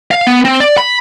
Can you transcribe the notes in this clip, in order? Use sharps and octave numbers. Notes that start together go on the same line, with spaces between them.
F5
B3
C4
D5
B5